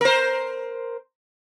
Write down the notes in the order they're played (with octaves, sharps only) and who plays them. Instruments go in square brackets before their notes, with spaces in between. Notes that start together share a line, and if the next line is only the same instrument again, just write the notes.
[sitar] A#4 C5